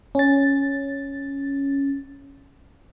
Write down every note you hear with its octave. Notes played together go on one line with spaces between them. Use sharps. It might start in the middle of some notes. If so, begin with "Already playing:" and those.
C#4 A6